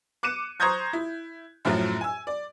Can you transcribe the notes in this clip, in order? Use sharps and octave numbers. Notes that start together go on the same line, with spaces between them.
D6 F#6 C#7 D#7 E7
C5 A#5 C#6 D#6 G6 G#6
E4
F#2 A2 F3 F#3
G#5 E6
D5